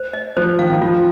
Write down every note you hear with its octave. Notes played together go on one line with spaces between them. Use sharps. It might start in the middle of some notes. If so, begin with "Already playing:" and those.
Already playing: C5
D#5
F3 C5
D#3 F5
D#3
F3 F4